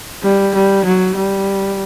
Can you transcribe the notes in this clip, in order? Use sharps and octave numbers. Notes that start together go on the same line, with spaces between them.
G3
G3
F#3
G3